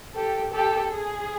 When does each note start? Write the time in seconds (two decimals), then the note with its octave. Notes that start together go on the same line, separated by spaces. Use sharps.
0.15 G4 A4
0.53 G4 A4
0.92 G#4